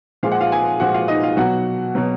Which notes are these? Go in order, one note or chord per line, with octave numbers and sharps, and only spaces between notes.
A#2 F3 G#3 F5
F#5
F4 F5
G#4 G#5
A#2 F3 G#3 F#4 F#5
F4 F5
D#4 D#5
F4 F5
B2 F#3 F#4 F#5
B2 F#3